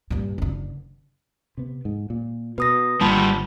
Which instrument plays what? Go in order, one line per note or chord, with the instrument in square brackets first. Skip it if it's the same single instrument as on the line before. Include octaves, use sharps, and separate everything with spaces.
[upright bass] G2 A#2
F#1 D3
[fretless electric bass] C3 B3
G#2
A#2
[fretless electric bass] B2 [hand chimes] B4 D#6 A#6
[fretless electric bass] G#1 D3 A#3 [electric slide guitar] G3 F4 [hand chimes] A5 B5